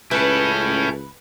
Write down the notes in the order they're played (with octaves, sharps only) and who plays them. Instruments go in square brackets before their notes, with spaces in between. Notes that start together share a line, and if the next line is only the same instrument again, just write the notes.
[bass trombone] C#2 [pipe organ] C#4 G6 [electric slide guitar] E4 A4 [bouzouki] B4